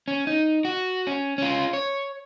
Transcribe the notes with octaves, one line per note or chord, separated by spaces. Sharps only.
C#4
D#4
F#4
C#4
C#4 F4
C#5